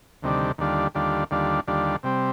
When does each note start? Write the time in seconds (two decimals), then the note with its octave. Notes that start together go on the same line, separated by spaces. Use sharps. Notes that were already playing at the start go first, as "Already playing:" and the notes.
0.22 D2 C3 D#3 G3 D4
0.58 D#2 D3 G3 D4 F4
0.95 D#2 D3 G3 D4 F4
1.31 D#2 D3 G3 D4 F4
1.67 D#2 D3 G3 D4 F4
2.03 C3 G3 C4